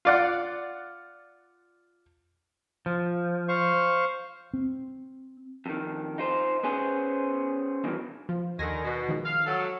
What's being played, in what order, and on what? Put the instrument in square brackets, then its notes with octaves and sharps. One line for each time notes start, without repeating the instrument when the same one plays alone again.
[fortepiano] F4 D5 F#5
[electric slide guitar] F3
[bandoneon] C5 F5 C#6
[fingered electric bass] C4
[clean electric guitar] F2 D#3
D#4 F4 C5
B3 C#4 G#4 C5
E2 G2 B2 D#3 E3
[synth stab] F3
[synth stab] D#2 G#5 A#6 [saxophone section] D3 D#3
[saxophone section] B2
[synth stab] D#3 F3 G#3
[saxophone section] F5
F#3 A4